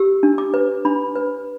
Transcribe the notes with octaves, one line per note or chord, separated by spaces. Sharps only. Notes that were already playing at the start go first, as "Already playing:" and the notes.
Already playing: G4 E6
D4
D6
B4
D4 B5
B4